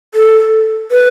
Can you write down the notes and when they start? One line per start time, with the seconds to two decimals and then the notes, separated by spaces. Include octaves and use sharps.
0.14 A4
0.91 B4